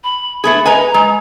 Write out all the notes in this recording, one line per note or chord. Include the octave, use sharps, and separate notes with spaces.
B5
A3 B3 G#4 B5
B4 D#5 G#5 A#5
G#3